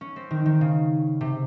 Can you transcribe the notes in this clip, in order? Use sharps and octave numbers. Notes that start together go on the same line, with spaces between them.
C#4
C4
D#3
D#3
C#3
C3